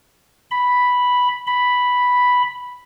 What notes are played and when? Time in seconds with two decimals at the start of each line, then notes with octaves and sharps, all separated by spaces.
0.51 B5
1.47 B5